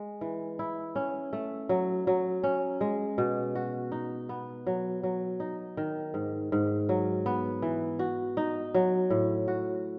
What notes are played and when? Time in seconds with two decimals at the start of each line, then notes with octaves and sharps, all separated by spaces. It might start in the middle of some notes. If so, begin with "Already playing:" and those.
Already playing: G#3
0.21 E3
0.59 E4
0.96 C#4
1.33 A3
1.69 F#3
2.07 F#3
2.43 C#4
2.81 G#3
3.18 B2
3.55 F#4
3.92 D#4
4.29 B3
4.67 F#3
5.03 F#3
5.40 D#4
5.77 D#3
6.14 G#2
6.52 G#2
6.89 F#3
7.26 B3
7.62 E3
7.99 F#4
8.37 D#4
8.74 F#3
9.10 A2
9.48 F#4